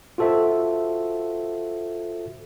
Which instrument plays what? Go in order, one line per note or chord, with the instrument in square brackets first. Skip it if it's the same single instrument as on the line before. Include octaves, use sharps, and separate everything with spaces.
[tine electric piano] F4 F#4 A4 C5 E5